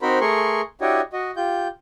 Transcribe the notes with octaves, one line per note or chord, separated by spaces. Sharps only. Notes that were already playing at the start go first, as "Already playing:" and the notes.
C4 D#4 F#4 A#4 C5 B5
A3 G#4 A#4 C6 C#6
D4 E4 F#4 G4 C#5 D#5
F#4 D#5
F4 G4 G6